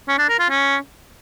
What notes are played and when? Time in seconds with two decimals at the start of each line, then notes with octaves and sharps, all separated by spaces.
0.08 C#4
0.18 D4
0.29 A#4
0.39 F4
0.49 C#4